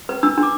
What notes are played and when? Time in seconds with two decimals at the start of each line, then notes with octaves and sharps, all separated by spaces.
0.09 B4
0.23 D4 E6
0.37 D4
0.43 D6